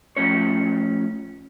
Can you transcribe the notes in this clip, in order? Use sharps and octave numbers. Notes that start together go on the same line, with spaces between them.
A2 F3 C#4 C#5